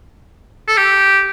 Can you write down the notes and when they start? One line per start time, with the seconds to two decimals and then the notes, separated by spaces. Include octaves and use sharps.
0.68 A4
0.77 G4